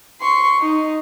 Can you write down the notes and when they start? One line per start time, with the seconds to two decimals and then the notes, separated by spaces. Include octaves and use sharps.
0.21 C6 C#6
0.61 D#4